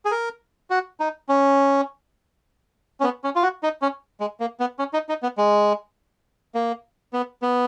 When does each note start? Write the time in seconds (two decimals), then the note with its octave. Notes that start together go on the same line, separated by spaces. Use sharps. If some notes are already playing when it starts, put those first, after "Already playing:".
0.05 G#4
0.11 A#4
0.70 F#4
1.00 D#4
1.29 C#4
3.00 C#4
3.03 B3
3.24 C#4
3.36 F4
3.42 F#4
3.63 D#4
3.82 C#4
4.20 G#3
4.40 A#3
4.60 B3
4.79 C#4
4.93 D#4
5.09 D#4
5.23 B3
5.38 G#3
6.55 A#3
7.13 B3
7.42 B3